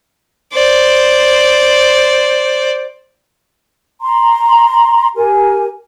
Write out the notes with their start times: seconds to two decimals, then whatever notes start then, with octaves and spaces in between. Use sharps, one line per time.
0.53 C5 D5
4.01 A#5 C6
5.16 G4 A#4 G#5